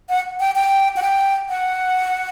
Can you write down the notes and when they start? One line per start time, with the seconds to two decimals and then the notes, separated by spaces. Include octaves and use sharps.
0.09 F#5
0.40 G5
0.56 G5
0.97 F#5
1.02 G5
1.49 F#5